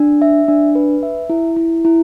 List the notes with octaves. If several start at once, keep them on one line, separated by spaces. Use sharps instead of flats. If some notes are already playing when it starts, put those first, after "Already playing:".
Already playing: D4
E5
D4
B4
E5
E4
E4
E4